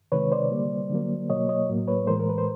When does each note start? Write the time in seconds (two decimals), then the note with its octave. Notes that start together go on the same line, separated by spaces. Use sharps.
0.12 C3 D#3 G#3 B4 C#5
0.32 C5 D5
0.51 D3 G3 A#3
0.90 D3 F#3 A#3
1.29 B2 F#3 A#3 C#5 D#5
1.49 C#5 D#5
1.69 A2 F#3 A#3
1.88 B4 C#5
2.07 A2 E3 G#3 A#4 C5
2.20 A#4
2.29 B4
2.38 C5